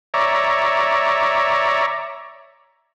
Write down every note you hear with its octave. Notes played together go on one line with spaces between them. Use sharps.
C#5 D5 E5 A#5